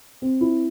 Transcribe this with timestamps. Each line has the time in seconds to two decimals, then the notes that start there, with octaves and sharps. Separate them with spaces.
0.22 C4
0.41 E4